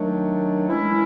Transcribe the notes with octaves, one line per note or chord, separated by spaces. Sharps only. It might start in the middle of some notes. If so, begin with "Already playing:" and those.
Already playing: D#3 F#3 A3 D4
E3 G#3 C#4 E4